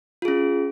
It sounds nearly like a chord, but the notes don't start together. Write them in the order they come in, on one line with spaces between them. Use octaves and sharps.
F4 G#4 C#4